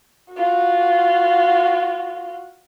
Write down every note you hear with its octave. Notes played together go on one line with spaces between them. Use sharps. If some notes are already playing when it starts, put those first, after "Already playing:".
F4 F#4